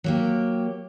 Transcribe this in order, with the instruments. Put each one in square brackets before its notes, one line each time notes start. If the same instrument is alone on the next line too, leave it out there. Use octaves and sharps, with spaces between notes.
[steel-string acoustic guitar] F#3 A#3 G4